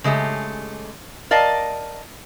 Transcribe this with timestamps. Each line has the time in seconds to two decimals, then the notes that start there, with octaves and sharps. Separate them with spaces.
0.04 C#3 G#3 A3 G4
1.31 A#4 D5 D#5 F5 A5